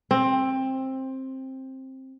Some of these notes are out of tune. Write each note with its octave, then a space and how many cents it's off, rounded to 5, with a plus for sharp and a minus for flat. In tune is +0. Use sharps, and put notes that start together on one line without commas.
C4 +15